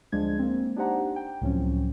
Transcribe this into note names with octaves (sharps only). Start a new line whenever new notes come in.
D2 F3 G#3 D4 G#6
A#3 C4
D4 D#4 G4 C5 F#5 A#5
G5
C#2 A2 F3 F#3 C4 C#4